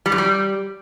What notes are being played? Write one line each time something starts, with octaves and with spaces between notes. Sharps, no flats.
G3
F#2
G3